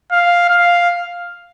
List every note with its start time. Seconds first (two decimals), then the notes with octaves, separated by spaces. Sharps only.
0.12 F5
0.49 F5